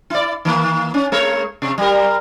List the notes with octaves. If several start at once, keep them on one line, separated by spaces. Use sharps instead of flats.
E4 D5
D#3 A#3
C#4
G#3 A#4 C#5
C3
G3 A#4